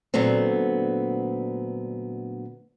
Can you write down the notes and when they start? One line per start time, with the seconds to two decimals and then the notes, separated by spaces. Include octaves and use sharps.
0.14 A#2 D3 F#3 A3 B3 C4